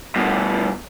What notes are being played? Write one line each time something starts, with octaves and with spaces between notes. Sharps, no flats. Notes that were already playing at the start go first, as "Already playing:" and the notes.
G2 B2